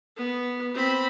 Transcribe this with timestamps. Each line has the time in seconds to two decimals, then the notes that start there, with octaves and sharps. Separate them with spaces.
0.17 B3
0.74 C4 B5